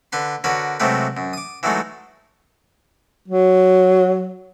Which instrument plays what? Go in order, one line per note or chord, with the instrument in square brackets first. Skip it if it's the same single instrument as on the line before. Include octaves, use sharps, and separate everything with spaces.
[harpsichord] D3 B4 C6
D3 F#4 A#4 B4 C#5
C3 F#3 G#3 A3 G4 B4
F#2
D6 D#6
E3 F#3 G#3 A3 D#4
[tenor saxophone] F#3